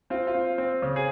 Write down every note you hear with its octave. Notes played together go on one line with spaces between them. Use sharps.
C4 F4
F4
C4
C4
C#3
G#4